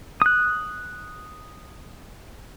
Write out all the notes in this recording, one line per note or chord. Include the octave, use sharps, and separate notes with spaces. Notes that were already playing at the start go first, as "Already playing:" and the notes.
D#6 F#6